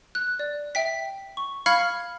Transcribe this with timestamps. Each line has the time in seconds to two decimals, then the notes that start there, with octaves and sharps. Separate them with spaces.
0.15 F#6
0.39 D5
0.75 E5 G5 B6
1.37 C#6
1.66 F5 B5 C#6 F6 G#6 C#7